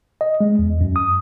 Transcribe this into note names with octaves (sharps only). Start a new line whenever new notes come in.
D#5
G#3
E2
F#2
D#6